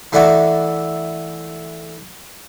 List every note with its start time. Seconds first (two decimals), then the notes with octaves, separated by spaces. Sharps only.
0.12 E3 A3 D4 E4 F#4